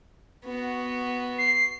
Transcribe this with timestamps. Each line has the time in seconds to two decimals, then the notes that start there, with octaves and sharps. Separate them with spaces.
0.45 B3 F#4
1.38 C7